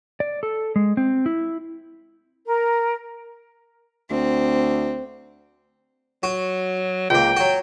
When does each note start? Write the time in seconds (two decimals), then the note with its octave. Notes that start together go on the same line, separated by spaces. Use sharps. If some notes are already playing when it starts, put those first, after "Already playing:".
0.20 D5
0.43 A4
0.76 G#3
0.97 C4
1.26 E4
2.46 A#4
4.10 D2 C4
6.23 F#3 F#4
7.10 C#2 A#3 G5
7.37 F#3 F#4